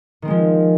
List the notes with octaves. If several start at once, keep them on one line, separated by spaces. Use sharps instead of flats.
D#3 F3 G#3 C4